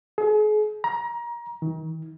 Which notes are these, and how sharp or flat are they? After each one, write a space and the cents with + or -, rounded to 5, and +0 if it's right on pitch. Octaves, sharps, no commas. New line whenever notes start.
G#4 +40
A#5 +25
D#3 +45